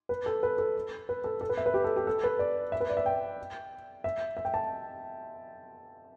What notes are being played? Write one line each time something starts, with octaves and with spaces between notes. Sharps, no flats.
B4
A4
B4
A4
B4
A4
A4
B4
E5
B4
G4
A4
G4
A4
B4
D5
E5
B4
D5
E5
G5
E5
E5
G5
A5